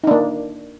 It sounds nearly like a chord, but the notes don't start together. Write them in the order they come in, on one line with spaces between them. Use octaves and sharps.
D#4 D4 A#3